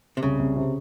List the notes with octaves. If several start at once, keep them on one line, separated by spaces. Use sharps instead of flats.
C3
C2 C#3
C2
C3